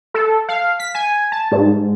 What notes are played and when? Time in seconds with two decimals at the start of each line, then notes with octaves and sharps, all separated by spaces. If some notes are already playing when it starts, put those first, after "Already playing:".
0.14 A4
0.49 F5
0.80 B6
0.95 G#5
1.32 A5
1.52 G#2